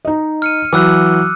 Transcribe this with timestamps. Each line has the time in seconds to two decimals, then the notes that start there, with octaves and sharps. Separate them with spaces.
0.05 D#4 D#5
0.42 F6 C#7 D#7
0.73 E3 F#3 D6 E6 F#6